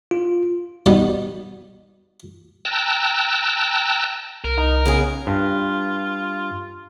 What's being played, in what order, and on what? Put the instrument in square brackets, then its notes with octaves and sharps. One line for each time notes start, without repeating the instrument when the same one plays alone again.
[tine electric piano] F4
[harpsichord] B2 D#3 G3 B3 D#4 D5
[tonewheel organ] G5 A5 A#5 E6 F#6
[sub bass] C2 [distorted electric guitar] A#4
[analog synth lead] D#4
[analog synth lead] C#3 [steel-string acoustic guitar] B3 C#4 G#4
[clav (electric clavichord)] G2 [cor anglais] F4